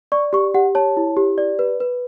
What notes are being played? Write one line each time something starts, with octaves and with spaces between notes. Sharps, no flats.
D5 C#6
G4 C#6
G4 F#5
C#5 A5
E4
G4
D5
B4
B4